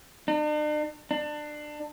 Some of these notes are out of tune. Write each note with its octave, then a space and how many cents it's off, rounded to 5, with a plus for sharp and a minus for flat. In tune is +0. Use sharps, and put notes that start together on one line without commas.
D4 +45
D4 +25